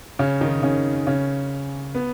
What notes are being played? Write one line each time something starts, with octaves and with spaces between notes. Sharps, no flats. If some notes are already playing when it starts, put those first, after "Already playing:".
C#3 C#4
D#3 D#4
C#3 C#4
C#3 C#4
B3